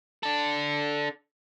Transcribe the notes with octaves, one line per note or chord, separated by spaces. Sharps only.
D4 A4